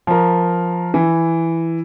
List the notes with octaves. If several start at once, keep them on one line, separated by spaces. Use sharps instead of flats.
F3 A#4
E3